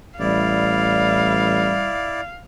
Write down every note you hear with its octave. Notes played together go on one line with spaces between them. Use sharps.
A1 G3 E4 D5 F5